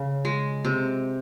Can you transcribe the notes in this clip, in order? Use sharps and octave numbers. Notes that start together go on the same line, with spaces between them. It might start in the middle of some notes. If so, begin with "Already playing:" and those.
Already playing: C#3
G#3
C3